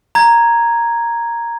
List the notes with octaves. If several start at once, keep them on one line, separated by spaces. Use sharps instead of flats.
A#5 G#6